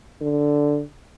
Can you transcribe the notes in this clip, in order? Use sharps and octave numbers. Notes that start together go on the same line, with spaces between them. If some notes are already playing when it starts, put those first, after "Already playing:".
D3